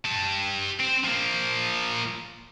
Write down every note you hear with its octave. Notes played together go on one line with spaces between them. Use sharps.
G4 A5
C4
F3 A#3